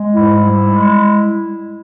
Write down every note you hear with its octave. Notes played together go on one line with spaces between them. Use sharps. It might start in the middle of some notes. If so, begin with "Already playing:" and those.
Already playing: G#3
G#2 E4
G3
G#3